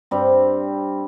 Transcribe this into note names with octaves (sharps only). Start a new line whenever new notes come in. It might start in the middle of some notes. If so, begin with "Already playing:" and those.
G2 G3 C4